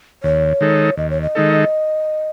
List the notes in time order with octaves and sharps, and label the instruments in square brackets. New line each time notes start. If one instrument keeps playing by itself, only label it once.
[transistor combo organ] D#2 [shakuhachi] C#5
[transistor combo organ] D#3 G#3 D#4 A4
[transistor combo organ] D#2 [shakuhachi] D#5
[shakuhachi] C#5
D#5
[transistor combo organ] D#3 G#3 D#4 A4